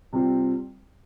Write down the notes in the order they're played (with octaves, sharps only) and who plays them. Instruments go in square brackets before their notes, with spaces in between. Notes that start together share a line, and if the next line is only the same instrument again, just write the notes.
[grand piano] C3 G3 C4 F4